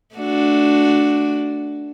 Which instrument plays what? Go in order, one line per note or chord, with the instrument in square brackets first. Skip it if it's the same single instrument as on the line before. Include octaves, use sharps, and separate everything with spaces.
[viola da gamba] A3 D4 F#4